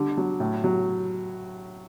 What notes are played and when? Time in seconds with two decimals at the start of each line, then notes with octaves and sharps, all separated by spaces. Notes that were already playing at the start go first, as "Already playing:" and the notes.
Already playing: D3 G3
0.17 F#3
0.40 A2
0.64 F#3